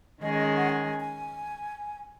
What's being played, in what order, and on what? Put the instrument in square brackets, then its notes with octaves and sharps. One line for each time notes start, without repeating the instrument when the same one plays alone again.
[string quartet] D#3 G#3 C#4 G#4 [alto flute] D#5
[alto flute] D#5
F#5
G#5
G#5
G#5